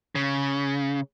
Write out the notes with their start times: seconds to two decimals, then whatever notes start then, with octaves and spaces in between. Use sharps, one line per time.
0.15 C#3